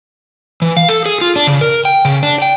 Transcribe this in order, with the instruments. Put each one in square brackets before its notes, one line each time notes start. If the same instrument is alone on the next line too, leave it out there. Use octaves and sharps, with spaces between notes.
[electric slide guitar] E3
F5
A4
G#4
F4
D4
C#3
A#4
G5
C#3
D4
G5